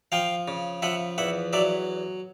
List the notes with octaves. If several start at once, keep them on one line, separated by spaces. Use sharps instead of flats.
F3 F5 G5
C#3
F3 E5 F#5
E2 E5 F#5
F#3 D5 E5